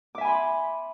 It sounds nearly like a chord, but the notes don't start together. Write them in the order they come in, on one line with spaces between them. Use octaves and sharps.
D6 E5 G#5 B5 C6